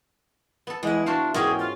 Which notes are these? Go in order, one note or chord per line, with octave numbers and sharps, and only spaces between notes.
B3 A4
E2 E3 G#3 E4
D4 F#4 C5 F5
E2 G#2 C#4 G#4 A#4 G5
F4